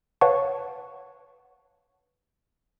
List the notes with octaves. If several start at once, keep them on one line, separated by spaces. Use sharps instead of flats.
B4 C#5 F5 F#5 A5 C#6